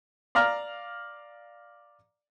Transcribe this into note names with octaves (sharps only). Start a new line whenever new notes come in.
D5 F5 A#5 F6